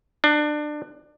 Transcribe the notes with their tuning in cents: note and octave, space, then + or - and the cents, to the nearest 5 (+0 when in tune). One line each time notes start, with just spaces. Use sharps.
D4 +25